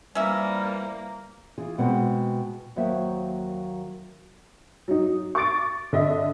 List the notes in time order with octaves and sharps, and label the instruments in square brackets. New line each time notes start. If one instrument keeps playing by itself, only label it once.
[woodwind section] E3 F3 G3 [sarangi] A#3 [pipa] C#4 E5
[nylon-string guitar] E3 F4 G#4
B2 G#3 C4 F#5
D#2 F#3 A#3 C5 E5
[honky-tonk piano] F#3 D#4
C#6 D6 A6 D7
D3 D#5 E5